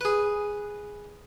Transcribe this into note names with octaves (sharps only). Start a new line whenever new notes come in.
G#4 B4